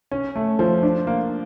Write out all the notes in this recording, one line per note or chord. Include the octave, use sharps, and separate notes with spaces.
C#4
A3
F3
D4
A#3